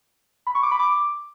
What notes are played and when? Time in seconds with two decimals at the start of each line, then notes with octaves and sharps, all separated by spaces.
0.47 B5
0.55 C#6
0.63 D6
0.71 B5
0.79 D6